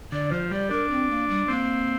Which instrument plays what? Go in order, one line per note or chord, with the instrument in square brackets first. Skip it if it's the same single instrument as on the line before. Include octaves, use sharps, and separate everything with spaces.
[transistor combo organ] D3 [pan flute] D5
[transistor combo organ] F3 [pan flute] C5
[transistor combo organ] G3 [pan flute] D5
[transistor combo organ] D4 [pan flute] A#4
[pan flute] C4
A#3
G3
[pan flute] A#3 [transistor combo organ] C4